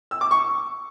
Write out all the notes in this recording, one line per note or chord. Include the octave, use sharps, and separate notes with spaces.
E6
D6
C#6